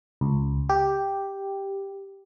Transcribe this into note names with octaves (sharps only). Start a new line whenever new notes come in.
C#2
G4